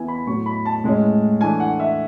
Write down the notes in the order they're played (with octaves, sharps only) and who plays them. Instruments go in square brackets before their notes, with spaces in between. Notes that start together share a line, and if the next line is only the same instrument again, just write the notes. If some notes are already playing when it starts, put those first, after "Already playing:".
Already playing: [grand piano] E3 B3 E4 G#5
B5
A2 F#3 A3 C#6
B5
A5
A2 G#3 C#4
E3 A3 D4 G#5
F#5
E5